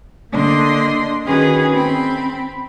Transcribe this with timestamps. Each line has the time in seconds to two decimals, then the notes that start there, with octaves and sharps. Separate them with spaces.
0.31 D3 A#3 D4 D#5 C6
1.25 D#3 C#4 F#4 G#4 B4
1.72 C4 B5